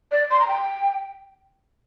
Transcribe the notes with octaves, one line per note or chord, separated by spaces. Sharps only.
D5
C6
A#5
G5